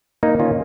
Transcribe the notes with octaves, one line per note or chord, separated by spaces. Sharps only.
A#3 D#4
D#3 C#4 F4